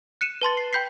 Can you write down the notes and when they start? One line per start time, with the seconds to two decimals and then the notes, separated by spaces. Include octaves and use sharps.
0.21 F#6 C#7 D#7 E7
0.42 B4 A5 C6 A6
0.57 C7
0.73 G5 B5 G6 B6 C7